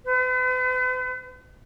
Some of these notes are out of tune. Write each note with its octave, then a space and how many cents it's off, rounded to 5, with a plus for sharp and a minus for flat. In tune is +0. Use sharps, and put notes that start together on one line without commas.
B4 +45